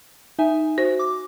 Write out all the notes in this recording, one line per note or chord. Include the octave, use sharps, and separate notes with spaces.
D#4 E5 G#5
F#4 C5
D6